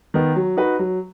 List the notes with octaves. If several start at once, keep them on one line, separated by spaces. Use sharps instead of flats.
D#3 B3
F#3
D#4 F#4 B4
F#3